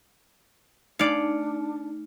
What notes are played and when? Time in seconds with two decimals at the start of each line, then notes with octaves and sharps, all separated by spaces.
0.99 A3 D4 D#4 D5 F5 C#7